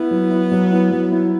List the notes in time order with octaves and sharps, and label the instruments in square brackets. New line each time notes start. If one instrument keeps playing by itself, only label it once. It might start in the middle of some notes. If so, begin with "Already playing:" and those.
Already playing: [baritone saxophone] B3 [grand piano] E4
[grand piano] F#3
E4
F#3
E4
F#3
E4